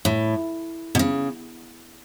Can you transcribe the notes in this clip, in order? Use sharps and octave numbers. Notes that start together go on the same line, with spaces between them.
A2
B2
C#3